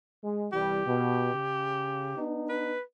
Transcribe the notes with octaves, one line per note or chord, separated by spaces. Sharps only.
G#3
C2 E3 G3 G4
B2
C#3
B3 D4 D#4
B4